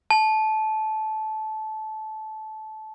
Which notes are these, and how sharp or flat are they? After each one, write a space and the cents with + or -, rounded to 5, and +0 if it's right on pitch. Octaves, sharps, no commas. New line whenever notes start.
A5 -20